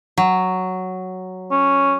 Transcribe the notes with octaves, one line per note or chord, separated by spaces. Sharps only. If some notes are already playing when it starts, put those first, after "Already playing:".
F#3
C#4